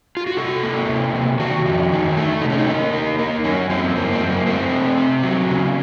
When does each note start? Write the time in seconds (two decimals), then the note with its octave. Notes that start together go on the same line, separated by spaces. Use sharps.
0.17 F4
0.27 F#4
0.37 C3 A4
0.63 A#3
0.89 C3
1.14 C3
1.39 D#3 F#4
1.65 F2
1.91 D#3
2.17 A3
2.42 C3 D#4
2.50 C#4
2.58 D#4
2.67 A#3
2.93 A#3
3.19 A#3
3.44 F#2 C#4
3.69 F#2 C4
3.95 F#2 A#3
4.12 C4
4.20 F#2
4.29 A#3
4.46 A3 C4
4.72 C3
4.98 C3
5.23 F#3
5.48 C#3